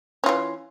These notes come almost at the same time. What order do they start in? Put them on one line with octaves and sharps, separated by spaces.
C#4 F4 E3